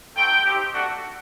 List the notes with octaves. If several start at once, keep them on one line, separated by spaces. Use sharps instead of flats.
A3 C4 D#4 F#4 G5
C4 D#4 G4
A3 D4 F#4